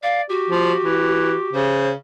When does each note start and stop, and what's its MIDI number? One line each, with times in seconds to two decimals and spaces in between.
0.03 0.24 74
0.03 0.21 77
0.30 1.49 66
0.30 1.78 67
0.50 0.72 53
0.85 1.33 52
1.53 1.91 49
1.53 1.90 72